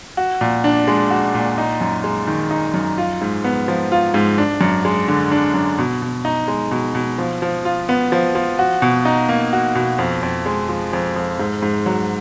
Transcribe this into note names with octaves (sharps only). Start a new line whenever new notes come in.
F#4
A#2
D4
G#3
F#4
A#2
D#4
F#2
G#3
D#3
D#4
F#2
F4
G#2
B3
F3
F4
G#2
D4
F#2
G#3
D3
D4
F#2
B2
B2
D#4
G#3
B2
B2
F3
F3
F4
B3
F3
F3
F#4
B2
D#4
A#3
F#4
B2
F2
F2
G#3
F3
F2
F2
G#2
G#2
F#3